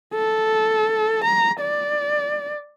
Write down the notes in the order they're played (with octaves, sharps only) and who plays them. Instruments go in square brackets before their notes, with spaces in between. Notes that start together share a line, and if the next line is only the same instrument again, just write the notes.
[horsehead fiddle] A4
A#5
D5